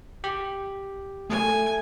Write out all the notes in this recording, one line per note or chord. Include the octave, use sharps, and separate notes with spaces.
G4
A3 G#5